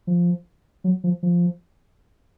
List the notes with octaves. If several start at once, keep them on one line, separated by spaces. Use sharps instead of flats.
F3
F#3
F3
F3